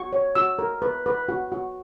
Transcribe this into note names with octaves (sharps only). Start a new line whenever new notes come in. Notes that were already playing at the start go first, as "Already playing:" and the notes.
Already playing: F#4 C#6
C#5
F#4 E6
A#4
B4
B4
F#4
F#4